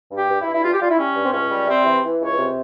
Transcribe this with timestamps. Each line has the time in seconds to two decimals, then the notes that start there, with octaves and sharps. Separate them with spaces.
0.11 G2
0.16 G4
0.29 G2
0.40 E4
0.46 G2
0.53 E4
0.63 G3 F4
0.73 G4
0.81 G3 F4
0.90 E4
0.98 G3 C#4
1.16 G2
1.24 C4
1.32 C#2 C#4
1.51 G3
1.67 C3 C4
1.85 E3
2.03 E3
2.20 C#2
2.25 C#5
2.37 C3